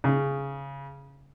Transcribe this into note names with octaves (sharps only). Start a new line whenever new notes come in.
C#3